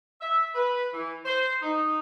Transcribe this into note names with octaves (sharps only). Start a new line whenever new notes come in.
E5
B4
E3
C5
D#4